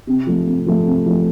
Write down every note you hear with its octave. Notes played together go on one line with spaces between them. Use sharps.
C3
F3 A3
C3
F3 A3
C3
F3 A3